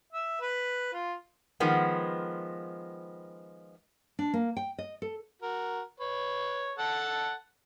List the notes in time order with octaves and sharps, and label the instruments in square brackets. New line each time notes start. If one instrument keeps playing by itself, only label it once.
[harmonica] E5
B4
F4
[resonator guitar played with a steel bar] D#3 F3 G#3 B3
[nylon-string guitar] D4
A#3
G5
D#5
A4
[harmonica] F#4 A#4
B4 C#5
A4 F#5 A5